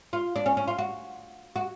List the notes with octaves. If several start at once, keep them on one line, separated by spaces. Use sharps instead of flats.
F4
D4
C#4
C#4
F4
F#4
F#4